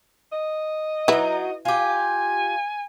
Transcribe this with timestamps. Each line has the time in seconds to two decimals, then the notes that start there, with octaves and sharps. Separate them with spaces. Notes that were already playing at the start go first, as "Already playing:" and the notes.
0.32 D#5
1.08 F#3 D#4 E4 B4
1.65 F4 G4 G#5